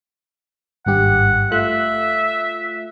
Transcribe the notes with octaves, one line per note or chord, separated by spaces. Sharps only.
G#1 G2 G4 F#5
A3 F4 E5 F#6